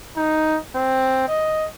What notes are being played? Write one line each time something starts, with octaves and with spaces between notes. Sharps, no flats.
D#4
C4
D#5